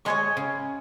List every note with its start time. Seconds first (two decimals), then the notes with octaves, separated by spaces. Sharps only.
0.05 G#3 C#5 G#5 C#6
0.37 C#3